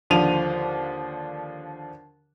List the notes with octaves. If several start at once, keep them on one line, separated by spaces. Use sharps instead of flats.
D#2 D3 F3 D4 D#7 F7